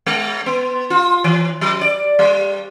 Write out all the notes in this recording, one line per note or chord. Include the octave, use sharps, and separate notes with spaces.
G#3
B3
F4
E3
F#3
D5
G3